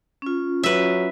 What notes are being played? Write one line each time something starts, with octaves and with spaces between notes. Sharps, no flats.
C#4 F4
F#3 B4 E5